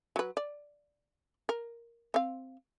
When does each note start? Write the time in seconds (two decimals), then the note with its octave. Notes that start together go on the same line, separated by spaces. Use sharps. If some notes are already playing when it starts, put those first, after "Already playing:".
0.16 F#3 B4
0.37 D5
1.49 A#4
2.14 C4 F5